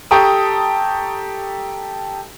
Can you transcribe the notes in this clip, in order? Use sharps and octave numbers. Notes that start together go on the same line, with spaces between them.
G4 A4 G5 A#5 C#6 D#6